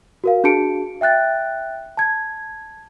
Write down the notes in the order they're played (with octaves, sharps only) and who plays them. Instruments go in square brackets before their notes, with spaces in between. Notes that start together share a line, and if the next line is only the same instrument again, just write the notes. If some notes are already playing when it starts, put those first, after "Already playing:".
[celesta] F#4 A#4 F5
D4 F#4 G#4 A5 C#7 D7
E5 G5 F#6 A6
A5 G#6